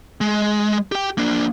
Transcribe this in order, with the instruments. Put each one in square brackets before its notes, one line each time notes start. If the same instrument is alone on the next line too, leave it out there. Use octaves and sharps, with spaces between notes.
[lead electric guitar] G#3
G4 G5
A#3 D4